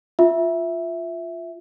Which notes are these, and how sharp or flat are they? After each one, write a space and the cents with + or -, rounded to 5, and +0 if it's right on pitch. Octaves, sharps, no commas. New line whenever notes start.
F4 +0 E5 +0